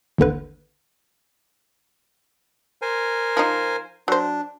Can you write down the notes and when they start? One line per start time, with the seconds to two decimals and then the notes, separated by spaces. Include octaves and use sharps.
0.18 G#1 D#2 D3 B4
2.82 A#4 C5 G#5
3.37 F3 D#4
4.08 F#3 D4 C5